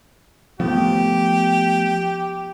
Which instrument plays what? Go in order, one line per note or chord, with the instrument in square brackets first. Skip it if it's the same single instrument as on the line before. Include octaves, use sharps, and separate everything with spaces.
[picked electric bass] F3 A3 B3 [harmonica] G4